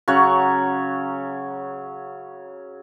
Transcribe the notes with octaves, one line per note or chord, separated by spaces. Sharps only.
C#3 F#3 C#5 F#5